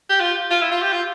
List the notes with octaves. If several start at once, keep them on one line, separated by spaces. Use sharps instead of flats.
G4
F4
F4
E4
F4
G4
F4